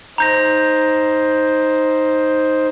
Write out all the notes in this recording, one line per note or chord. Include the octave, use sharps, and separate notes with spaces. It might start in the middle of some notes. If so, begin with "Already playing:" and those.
D#4 C5 A#5 G6 A#6